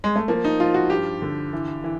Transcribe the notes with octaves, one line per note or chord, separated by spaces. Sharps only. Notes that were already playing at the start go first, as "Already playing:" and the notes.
G#3
A3
F3 A#3
D#4
F3 F4
F#4
G2 G4
D3
E3
E3